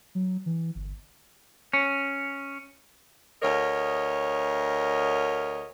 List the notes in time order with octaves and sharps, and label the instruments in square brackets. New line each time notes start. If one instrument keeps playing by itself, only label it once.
[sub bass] F#3
E3
G1
[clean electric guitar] C#4
[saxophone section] D2 A#4 C#5 D#5